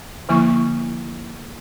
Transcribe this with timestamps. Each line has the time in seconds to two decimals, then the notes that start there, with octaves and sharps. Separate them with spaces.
0.29 D3 F3 A#3 E4 C#6